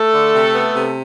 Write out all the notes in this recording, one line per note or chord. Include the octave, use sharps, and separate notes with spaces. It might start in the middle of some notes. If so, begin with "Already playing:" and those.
Already playing: A3 A4
D3
C3
B3
C3